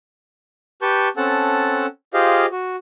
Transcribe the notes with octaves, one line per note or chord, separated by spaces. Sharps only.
G4 B4 A5 C#6 G6
C4 C#4 A4 F#5 A5
F4 G4 G#4 C5 D#5 F5
F#4